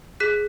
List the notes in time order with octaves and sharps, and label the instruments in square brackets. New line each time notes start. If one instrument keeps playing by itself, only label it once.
[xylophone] G#4 F#6 B6